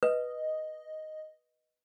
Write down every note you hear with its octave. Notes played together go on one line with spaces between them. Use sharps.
B4 D#5